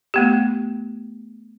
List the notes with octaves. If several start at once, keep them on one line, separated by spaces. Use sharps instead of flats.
A3 B3 G4